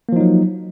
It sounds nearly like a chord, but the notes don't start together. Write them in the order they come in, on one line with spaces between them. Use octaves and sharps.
A#3 F3 D#4 F#3